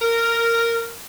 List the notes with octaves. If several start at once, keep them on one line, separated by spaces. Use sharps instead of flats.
A#4